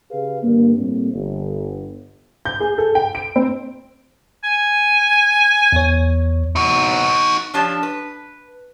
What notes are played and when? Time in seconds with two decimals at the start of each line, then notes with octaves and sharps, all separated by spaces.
0.10 C#3 G4 G#4 B4 F5
0.42 G2 D3 A#3
0.76 A2 G3 A#3 C4
1.12 G1
2.45 G6
2.60 G#4
2.78 A4
2.95 G5
3.15 D7
3.36 C4
4.44 G#5
5.72 E2 C#5
6.56 D#4 F#4
7.54 F3 D4 G4 C#5 A5
7.83 B4